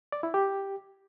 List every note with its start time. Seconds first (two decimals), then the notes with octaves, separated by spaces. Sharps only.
0.12 D5
0.23 E4
0.34 G4